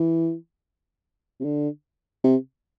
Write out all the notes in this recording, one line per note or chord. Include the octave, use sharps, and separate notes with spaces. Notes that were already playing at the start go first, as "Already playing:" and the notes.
Already playing: E3
C3
D3
C3